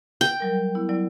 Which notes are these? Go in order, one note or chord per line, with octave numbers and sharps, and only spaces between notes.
G5
F#3 G3 A#4
B3 E4
F#3 E4 D5